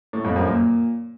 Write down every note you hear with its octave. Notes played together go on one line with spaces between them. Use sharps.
A2
F2
F#2
A#2